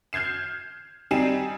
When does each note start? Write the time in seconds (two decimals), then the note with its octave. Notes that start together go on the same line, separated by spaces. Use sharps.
0.13 F6 G6 G#6 C7 E7
1.11 G3 C4 D#4 G#5 C7 E7